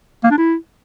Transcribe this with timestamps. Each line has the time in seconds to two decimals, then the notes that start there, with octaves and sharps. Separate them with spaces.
0.23 A#3
0.31 D4
0.38 E4